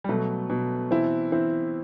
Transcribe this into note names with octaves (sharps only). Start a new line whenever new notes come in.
G3
B2 F#3 A3
B2
E3 C4 E4
E3 C4 E4